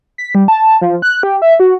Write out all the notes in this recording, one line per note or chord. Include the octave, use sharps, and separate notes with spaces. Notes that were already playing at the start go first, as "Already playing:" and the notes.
B6
G3
A5
F3
F#6
G4
E5
F#4